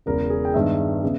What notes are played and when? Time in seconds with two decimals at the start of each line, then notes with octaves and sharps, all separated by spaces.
0.06 E1 E2 C#3 A#4
0.30 G#4
0.45 G5
0.54 G2 D#3 G#3 B3 E5
1.02 C#3 G#3 B3